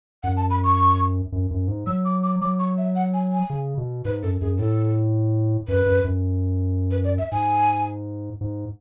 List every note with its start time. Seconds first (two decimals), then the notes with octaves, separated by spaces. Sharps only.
0.23 F#2 F#5
0.37 A5
0.50 B5
0.64 C#6
1.32 F#2
1.51 F#2
1.68 G#2
1.87 F#3 E6
2.05 D6
2.23 D6
2.41 F#3 D6
2.59 C#6
2.77 E5
2.95 F#5
3.14 G#5
3.32 G#5
3.50 C#3
3.77 B2
4.05 G#2 B4
4.23 F#2 A4
4.41 F#2 G#4
4.59 A2 A4
5.68 F#2 B4
5.86 F#2
6.04 F#2
6.91 B4
7.04 D5
7.18 E5
7.32 G#2 G#5
8.41 G#2